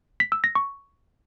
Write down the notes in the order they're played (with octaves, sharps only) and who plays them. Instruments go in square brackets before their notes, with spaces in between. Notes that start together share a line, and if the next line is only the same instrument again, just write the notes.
[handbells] B6
E6
A#6
C#6